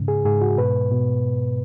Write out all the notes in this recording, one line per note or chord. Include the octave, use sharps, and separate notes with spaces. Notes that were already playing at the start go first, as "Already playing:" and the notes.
Already playing: G#2 C#3
G#4
G#2 G#4
F#4
B2 B4
B2